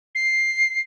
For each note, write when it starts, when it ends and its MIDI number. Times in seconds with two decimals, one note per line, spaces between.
0.15 0.80 96